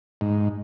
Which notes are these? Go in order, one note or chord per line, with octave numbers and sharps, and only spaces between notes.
G#2